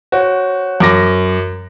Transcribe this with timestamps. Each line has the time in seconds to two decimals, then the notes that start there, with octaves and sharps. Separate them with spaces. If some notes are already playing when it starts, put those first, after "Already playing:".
0.12 F#4 C5 C#5
0.80 F#2 D6 A#6